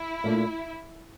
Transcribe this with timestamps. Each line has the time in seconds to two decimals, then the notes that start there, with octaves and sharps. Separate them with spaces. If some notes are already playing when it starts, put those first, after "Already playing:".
Already playing: E4
0.24 A#2 A3 D4